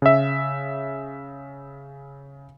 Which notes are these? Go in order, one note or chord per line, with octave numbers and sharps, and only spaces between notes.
C#3 E5